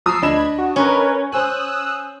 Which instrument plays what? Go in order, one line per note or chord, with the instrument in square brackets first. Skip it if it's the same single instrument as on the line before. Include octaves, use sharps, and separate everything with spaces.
[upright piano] F3 A#5 D#6 [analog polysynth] E6 C7
[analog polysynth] D2 B5 G#6 [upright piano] D4 D#5 E7
[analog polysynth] F#4
[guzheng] C#4 [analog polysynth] A#4 B4 C#5
[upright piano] C5 G#5 [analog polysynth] D#6 E6 F#6